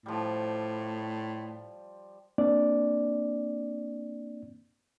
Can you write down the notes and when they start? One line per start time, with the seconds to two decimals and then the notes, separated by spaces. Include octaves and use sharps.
0.06 A2 F3 G3
2.38 A#3 C4 D4 D5